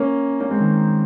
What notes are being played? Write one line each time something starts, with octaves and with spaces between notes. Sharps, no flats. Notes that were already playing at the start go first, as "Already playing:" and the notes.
Already playing: A#3 C#4
A#3 C#4
G#3 C4
D#3